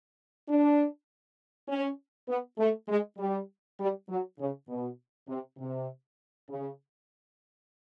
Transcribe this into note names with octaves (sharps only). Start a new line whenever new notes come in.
D4
C#4
B3
A3
G#3
G3
G3
F#3
C#3
B2
C3
C3
C#3